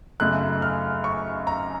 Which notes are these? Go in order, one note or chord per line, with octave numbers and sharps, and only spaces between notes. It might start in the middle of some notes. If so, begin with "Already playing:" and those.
F#2 C#3 A3 D#4 F#6
F6
C#6
A#5